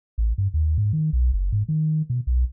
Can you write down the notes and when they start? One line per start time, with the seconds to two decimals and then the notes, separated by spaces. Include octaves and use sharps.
0.18 A1
0.38 G2
0.54 D#2
0.78 G#2
0.93 D#3
1.13 B1
1.33 F#1
1.52 G#2
1.69 D#3
2.10 B2
2.27 B1